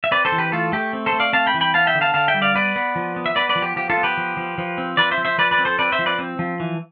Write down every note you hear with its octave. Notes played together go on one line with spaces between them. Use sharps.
E5
C4 B4 D5
A4 C5
E3
G4 B4
A3 F4 A4
A3 G4
C4
A4 C5
A3
D5 F5
C4 F5 A5
G5 B5
E3
G5 B5
B3 F5 A5
E5 G5
D3
F5 A5
D3 F5 A5
E5 G5
G3
D5 F5
B3 B4 D5
B3
F3
B3
E5
B3 B4 D5
B4 D5
F3
G4
F3 G4
F4 A4
B3
G4 B4
F3
F3
F3
C4
F3 B4 D5
C5 E5
F3
C5 E5
F3 B4 D5
B4 D5
C4
A4 C5
C4 B4 D5
C5 E5
F3
B4 D5
C4
F3
E3